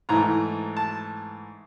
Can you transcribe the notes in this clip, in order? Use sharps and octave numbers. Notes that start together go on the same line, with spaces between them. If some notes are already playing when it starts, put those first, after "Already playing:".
G#2 E3 A3 A#5
A5